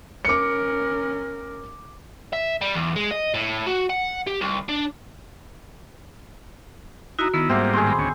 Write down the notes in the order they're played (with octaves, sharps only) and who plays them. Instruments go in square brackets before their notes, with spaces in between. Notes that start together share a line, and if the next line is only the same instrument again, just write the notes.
[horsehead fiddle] C#4 A#4 [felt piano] D6 C#7
[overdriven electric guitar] E5
G3
E2
G#3
D#5
A2
F#4
F#5
G4
C2
D4
[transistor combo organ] D#4 E4 [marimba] F#4 A#5
[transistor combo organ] D#3 E4 [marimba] B3
[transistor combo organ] G#2 G3 A#3 [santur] C4 [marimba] E5 F#5 D6
[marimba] A2 D#3 [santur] G#4 C5
[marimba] B5 C6 D6
[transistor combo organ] D2 C#4